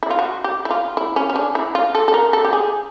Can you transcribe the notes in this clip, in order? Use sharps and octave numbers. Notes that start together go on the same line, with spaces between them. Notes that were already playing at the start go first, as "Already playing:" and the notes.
E4
F4
F#4
G4
E4
F4
E4
C#4
C#4
D4
E4
F4
A4
A4
A#4
A4
G4
G#4